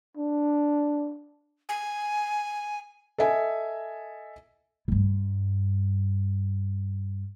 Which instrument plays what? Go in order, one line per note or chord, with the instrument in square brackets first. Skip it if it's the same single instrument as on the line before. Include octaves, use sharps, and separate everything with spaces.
[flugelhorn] D4
[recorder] G#5
[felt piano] A4 D#5 E5 G#5
[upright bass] G2 G3